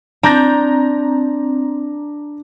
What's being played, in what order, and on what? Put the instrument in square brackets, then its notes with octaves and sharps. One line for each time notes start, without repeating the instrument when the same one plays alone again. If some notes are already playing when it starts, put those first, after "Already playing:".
[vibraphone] C4 [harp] D4 [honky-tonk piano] A#5 G6 A#6